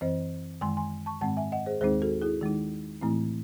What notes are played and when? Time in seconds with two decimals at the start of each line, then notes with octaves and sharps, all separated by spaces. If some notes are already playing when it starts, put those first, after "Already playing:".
0.01 F#2 E3 C4 C5 D#5
0.61 F#2 D#3 G#3 G#5 C6
0.77 G#5 C6
1.06 A5 C#6
1.21 G#2 D#3 G#3 C4 F#5 A5
1.37 E5 G#5
1.52 D#5 F#5
1.66 G#4 C5
1.81 D#2 D#3 G#3 C4 D#4 G#4 C5
2.02 F#4 A4
2.22 E4 G#4
2.41 D#3 G#3 D#4
3.01 A2 E3 A3 C4 E4